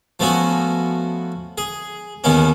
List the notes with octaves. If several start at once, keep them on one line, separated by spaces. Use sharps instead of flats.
F3 A3 B3 C#4 F#4
G#4
D#2 D#3 B3 C#4